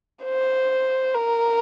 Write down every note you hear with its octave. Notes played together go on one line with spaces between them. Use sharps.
C5
A#4